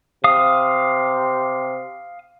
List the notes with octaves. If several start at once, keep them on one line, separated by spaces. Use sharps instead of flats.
C3 F5 D#6